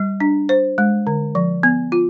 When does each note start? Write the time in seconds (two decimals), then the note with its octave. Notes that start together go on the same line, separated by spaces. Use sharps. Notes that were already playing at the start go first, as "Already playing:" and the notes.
Already playing: G3
0.20 D4
0.49 C5
0.78 G#3
1.07 D3
1.35 F3
1.63 B3
1.92 F4